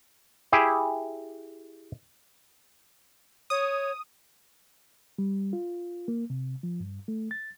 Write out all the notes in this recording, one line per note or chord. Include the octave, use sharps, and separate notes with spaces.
E4 G4 G#4
C#5 D#6
G3
F4
A#3
C3
F3
G2
A3
A6